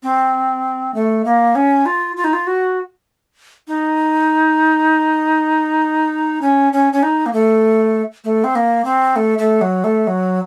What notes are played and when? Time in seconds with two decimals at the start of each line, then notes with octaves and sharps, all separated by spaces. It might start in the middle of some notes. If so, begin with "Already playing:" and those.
0.03 C4
0.94 A3
1.25 A#3
1.55 C#4
1.86 F4
2.17 F4
2.24 D#4
2.33 F4
2.47 F#4
3.68 D#4
6.42 C#4
6.73 C#4
6.93 C#4
7.03 D#4
7.26 A#3
7.33 A3
8.24 A3
8.44 C4
8.55 A#3
8.85 C4
9.16 A3
9.38 A3
9.61 F#3
9.84 A3
10.07 F#3